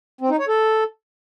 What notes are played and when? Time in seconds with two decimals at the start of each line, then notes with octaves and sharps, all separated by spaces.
0.21 C4
0.30 D#4
0.39 C#5
0.48 A4